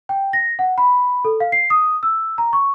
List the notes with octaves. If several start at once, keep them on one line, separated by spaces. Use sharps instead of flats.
G5
A#6
F#5
B5
A4
F5
C7
D#6
E6
A#5
C#6